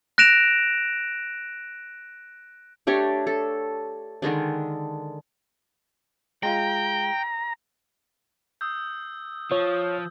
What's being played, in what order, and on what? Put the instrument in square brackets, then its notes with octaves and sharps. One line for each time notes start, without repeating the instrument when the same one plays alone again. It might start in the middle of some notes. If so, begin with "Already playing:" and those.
[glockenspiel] F#6 A#6 D7 E7 F7
[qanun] A3 D4 G4 C#5
A4
D3 D#3 G#3 D4
[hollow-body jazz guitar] G#3 F4 [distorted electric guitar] G5 [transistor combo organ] A#5
[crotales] D#6 E6 G6
[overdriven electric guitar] F3 [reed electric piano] C#5